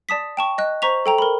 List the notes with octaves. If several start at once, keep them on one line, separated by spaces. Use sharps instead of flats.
D5 A5 D#6 B6
G5 A5 C#6
D#5 F#6
C5 A#5 C#6 B6 F7
A4 G5 A#5
A#4 B5